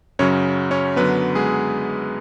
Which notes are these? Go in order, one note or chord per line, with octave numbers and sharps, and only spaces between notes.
F#2 C#3 F#3 C#4 C#5
C#4 C#5
F#2 D3 F#3 B3 B4
G#3 G#4